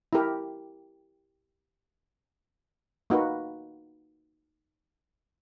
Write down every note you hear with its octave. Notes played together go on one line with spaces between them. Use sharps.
E4 G4 A#4
A#3 D#4 F#4 B4